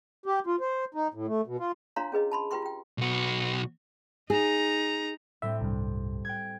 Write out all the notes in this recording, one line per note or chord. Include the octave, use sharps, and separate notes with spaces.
G4
F4
C5
D#4
A2
A3
B2
F4
D4 F4 C#5 F5 A#5 C6
C#4 G#4 B4 D#5
A5 B5 C6
F4 G4 B4 G5 C6 C#6
F4 G5
B1 F#4
D#4 G#4 A#5
A2 G3 C4 E5
C2 G2
G5 F#6 G#6